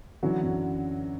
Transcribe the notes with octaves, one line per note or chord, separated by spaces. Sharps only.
D3 E3 F#3 C#4 F#4
F#2